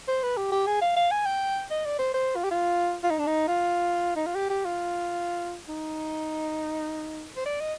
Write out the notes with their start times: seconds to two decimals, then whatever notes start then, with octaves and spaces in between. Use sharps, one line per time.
0.08 C5
0.23 B4
0.37 G4
0.52 G4
0.67 G#4
0.81 F5
0.96 F5
1.11 G#5
1.25 G5
1.71 D#5
1.85 D5
1.99 C5
2.14 C5
2.36 F4
2.44 G4
2.51 F4
3.03 F4
3.10 D#4
3.19 D4
3.27 D#4
3.48 F4
4.16 D#4
4.26 F4
4.35 G4
4.50 G4
4.65 F4
5.68 D#4
7.37 C5
7.46 D5
7.60 D#5